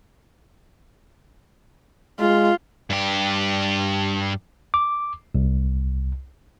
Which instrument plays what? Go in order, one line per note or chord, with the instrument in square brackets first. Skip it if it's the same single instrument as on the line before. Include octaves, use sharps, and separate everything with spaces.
[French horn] G#3 [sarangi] F4
[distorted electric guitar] G2 G4
[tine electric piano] D6
C2